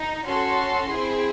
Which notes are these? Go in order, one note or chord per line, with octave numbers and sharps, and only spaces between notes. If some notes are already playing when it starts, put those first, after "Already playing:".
Already playing: D#4
C#4 F#4 A4 C6
C4 E4 G#4